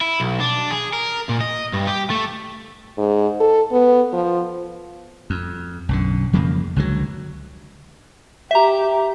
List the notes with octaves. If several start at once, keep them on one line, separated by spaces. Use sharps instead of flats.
E4
B1
D4
G#4
A#4
A#2
D#5
G2
G4
A3
G#2
A4
B3
F3
F2
B1 F#2 D3
F2 C#3 F3 A#3
C#2 D3 D#3 F#3
G4 E5 A#5